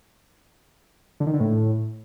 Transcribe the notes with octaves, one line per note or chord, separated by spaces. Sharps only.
D3
D#3
D3
A2